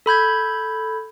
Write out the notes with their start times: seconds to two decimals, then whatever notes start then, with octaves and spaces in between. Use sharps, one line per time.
0.06 A4 B5 G6 G#6